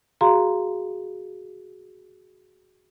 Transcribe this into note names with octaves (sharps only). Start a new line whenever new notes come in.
F#4 G#4 F5 A#5 C6